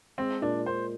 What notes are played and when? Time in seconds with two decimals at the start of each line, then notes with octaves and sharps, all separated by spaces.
0.18 G#3 C4
0.42 A#2 D4
0.66 A#2 C5